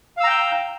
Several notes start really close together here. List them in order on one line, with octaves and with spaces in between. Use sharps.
F5 E6 A#5 G5 G6